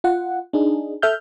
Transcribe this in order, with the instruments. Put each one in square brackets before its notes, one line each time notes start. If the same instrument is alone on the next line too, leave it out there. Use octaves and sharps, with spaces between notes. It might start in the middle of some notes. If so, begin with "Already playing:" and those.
[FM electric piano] F4 F#5
D4 D#4 G#4
A4 E5 F6 G6